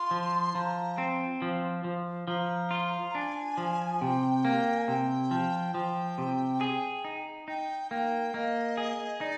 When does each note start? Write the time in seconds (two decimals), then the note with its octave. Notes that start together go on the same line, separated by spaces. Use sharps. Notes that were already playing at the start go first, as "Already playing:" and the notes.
Already playing: F4 C6
0.11 F3
0.55 F3 A#5
0.98 C4
1.42 F3
1.84 F3
2.28 F3 A#5
2.71 F4
3.15 D4 G#5
3.57 F3
4.01 C3 G5
4.45 A#3
4.77 G#5
4.88 C3 G5
5.31 F3
5.74 F3 G5
6.18 C3
6.61 G#4
7.05 D#4
7.48 D#4 G5
7.91 A#3 G5
8.34 A#3 D#5
8.77 G#4
9.21 D#4 D5